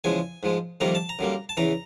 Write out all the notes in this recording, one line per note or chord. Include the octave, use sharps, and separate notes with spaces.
E2 C#3 F3 G#3 G#5
G#2 F3 G#3
F2 C3 D#3 G3 A#3 A#5
A5
A#5
F#2 D3 G3 A#3
A5
E2 C#3 E3 A#5